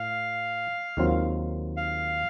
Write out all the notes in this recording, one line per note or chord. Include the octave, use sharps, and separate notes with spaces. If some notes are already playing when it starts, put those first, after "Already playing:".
Already playing: A2 F5
D#2 D#3 F#3 C4 F4
F5